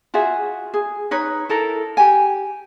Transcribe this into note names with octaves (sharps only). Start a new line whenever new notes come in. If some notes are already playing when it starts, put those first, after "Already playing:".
F4 F#4 G#4 E5
G#4
D#4 B4 C#5
E4 A4 A#4
G4 G#5